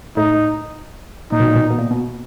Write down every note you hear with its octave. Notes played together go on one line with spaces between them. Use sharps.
A2 D#4
A#2 D#4
B2
A#2
B2
A#2
B2
A#2
B2